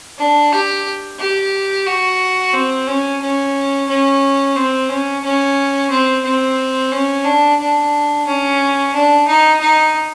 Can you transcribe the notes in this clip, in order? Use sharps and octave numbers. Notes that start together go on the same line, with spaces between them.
D4
G4
G4
F#4
C4
C#4
C#4
C#4
C4
C#4
C#4
C4
C4
C#4
D4
D4
C#4
D4
D#4
D#4